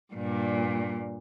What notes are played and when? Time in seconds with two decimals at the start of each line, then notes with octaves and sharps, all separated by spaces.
0.13 G2 A#2